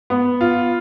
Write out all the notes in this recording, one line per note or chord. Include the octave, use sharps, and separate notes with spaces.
B3
F4